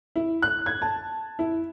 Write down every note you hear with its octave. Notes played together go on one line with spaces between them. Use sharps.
E4
F#6
G#6
A5
E4